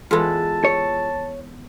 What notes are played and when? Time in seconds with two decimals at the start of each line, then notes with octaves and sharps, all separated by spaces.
0.11 E2 G#3 F4 A4 B4 A5
0.65 C#5